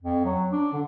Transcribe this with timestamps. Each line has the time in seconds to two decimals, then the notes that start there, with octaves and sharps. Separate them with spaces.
0.02 F2
0.25 F#3
0.52 D4
0.73 D3